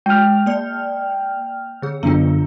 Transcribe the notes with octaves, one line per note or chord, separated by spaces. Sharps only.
G#3 G5 F6
A#3 D5
D3 G#4
F#2 D3 B3 D4 F4